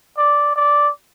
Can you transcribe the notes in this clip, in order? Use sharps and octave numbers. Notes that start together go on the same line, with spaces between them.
D5
D5